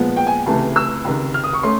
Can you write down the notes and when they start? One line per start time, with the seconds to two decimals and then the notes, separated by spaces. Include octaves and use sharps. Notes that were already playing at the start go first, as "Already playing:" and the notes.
Already playing: A#2 F3 G#3 B3
0.17 G5
0.27 G#5
0.46 C#2 C3 E3 A3 A5
0.76 E6
1.05 C#2 C3 D#3
1.34 F6
1.44 D#6
1.53 C#6
1.63 A3 C#4 C6